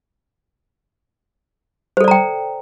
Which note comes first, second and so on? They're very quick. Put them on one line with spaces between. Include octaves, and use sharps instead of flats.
C5 A4 D5 A#5 G5